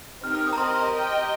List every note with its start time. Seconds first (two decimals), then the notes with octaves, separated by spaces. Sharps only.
0.23 C4 D#4 G4 A#4 F6
0.35 F6
0.47 D#6
0.53 A#5
0.58 C4 G4 A#4 D#5 C6
0.75 A#5
0.92 G4 D#5 G5